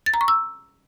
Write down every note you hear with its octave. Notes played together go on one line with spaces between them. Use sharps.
A6
A#5
C#6
E6